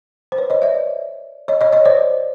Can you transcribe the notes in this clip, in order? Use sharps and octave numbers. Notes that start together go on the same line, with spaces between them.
C5
B4 C#5
C#5 D#5
D5 E5
C#5 D#5
C#5 D#5
C#5 D#5
C5 D5